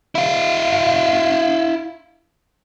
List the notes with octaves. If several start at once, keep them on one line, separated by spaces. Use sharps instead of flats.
E4 F5